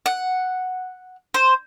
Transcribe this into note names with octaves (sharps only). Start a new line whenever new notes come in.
F#5
C5